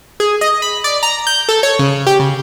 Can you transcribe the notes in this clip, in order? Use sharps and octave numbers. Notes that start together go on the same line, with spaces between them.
G#4
D#5
B5
D5
A#5
G6
A4
C#5
C#3
G4
C#3